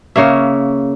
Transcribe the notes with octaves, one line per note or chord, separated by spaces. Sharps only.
C#3 A#3 C#5 E5